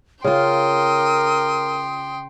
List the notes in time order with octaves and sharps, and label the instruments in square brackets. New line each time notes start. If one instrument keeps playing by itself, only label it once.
[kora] C#3 F4 [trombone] A#4 [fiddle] G5 C6 [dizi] D#6